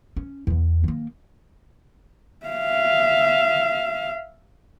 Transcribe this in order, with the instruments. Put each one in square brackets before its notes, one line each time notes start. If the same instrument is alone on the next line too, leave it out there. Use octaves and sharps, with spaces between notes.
[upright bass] C#4
E2 B3
D#3 A#3
[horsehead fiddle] E5 F5